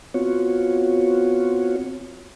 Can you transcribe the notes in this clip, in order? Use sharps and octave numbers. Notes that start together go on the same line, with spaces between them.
B3 C4 F4 F#4 C#5